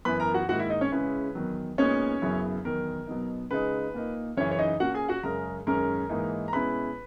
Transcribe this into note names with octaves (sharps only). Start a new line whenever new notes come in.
F#2 E3 B3 E4 B4 B5
A#4 A#5
F#4 F#5
G#2 D#3 A#3 E4 F#4 F#5
E4 E5
D#4 D#5
C#4 C#5
C#3 G#3 C#4 E4 B4
E2 D#3 F#3
A#2 G#3 B3 C#4 D#4 C#5
F#2 C#3 F#3 B3 E4
E2 D#3 F#3 A#4
B2 F#3 B3 D#4
C#3 G#3 D#4 B4
A#2 A#3 D#4
F#2 C#3 E3 C#4 C#5
C#5
D#4 D#5
A#2 A#3 C#4 F#4 F#5
G#4 G#5
F#4 F#5
F#2 C#3 G#3 C#4 A#4 A#5
F#2 D#3 G#3 C#4 A#4 A#5
G#2 E3 A#3 D#4
A#5
B2 G#3 C#4 E4 B4 B5